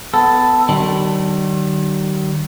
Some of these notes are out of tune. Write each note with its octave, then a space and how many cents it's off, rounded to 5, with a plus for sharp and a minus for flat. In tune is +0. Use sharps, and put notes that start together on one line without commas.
B3 +20 A4 +0
D#3 -30 G3 -45